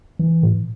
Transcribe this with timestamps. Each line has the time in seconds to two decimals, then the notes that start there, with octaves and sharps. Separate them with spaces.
0.19 E3
0.43 A2